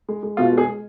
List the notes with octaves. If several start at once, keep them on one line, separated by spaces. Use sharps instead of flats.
G#3
G#3
B2 F4
G#3
G#4
G#3